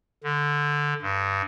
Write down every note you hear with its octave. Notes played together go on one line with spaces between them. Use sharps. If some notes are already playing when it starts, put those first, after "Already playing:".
D3
G2